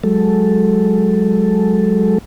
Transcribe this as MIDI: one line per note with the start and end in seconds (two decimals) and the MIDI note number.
0.04 2.18 54
0.04 2.18 56
0.04 2.18 69